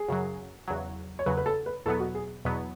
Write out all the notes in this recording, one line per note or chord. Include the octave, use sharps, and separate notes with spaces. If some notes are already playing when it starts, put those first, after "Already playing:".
Already playing: G#4
F#2 C#3 F#3
E2 C#3 F#3
C#5
E2 C#3 F#3 B4
B4
A4
B4
E2 B2 F#3 B3 A4
F#4
G#4
E2 B2 F#3 B3